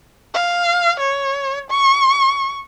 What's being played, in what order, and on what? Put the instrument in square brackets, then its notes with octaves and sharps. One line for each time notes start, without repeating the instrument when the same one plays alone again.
[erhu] F5
C#5
C#6